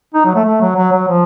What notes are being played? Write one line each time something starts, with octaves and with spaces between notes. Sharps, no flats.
D#4
F#3
A3
A3
F#3
F#3
F#3
F3